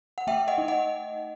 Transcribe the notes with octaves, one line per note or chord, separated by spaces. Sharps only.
F#5
A3 E5 G5
D#5 F#5
D#4
D#5 F#5